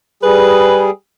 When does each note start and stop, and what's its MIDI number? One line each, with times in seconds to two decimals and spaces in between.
0.23 0.90 55
0.23 0.90 68
0.23 0.88 71